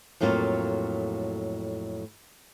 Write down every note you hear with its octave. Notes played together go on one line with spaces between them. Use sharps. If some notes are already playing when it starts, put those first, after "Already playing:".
F2 A2 F#3 A#3 F4